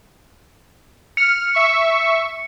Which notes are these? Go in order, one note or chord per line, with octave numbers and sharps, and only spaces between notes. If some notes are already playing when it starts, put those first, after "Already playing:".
F6 C#7
E5 C#6